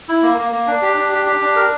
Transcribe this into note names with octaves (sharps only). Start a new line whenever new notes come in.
E4
A#3
A#3
A#3
D4
G4
D4
G4
G4
D4
A#4